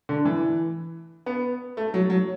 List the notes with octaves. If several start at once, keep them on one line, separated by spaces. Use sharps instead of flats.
D3
E3
B3
A3
F#3
F#3